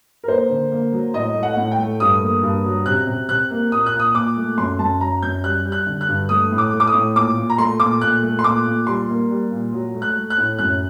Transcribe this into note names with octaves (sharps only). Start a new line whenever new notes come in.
A#4
A#3 C5
D3
A#3
F#3
A2 D#5
A3
F#5
A2
G5
A3
G2 D#6
A#3
G2
F#3
C3 F#6
C3
C3 F#6
A#3
A#2 D#6
F#6
A#2
D#6
A#2 D6
A3
F#2 C6
F#2 A5
F#3 A#5
F#2 G6
G3 F#6
G3
F#6
D3
F#6
G2
A3 D#6
A2
D6
A3
D6
D#6
A2
A#2 D6
A#2
A#5
A3 C6
A#2 D6
A#2 F#6
A3
C6
A#2 D6
A#2
G3 C6
A#3
G3
A#2
F#3
A3
F#6
A3
F#6
A2
F#2 F#6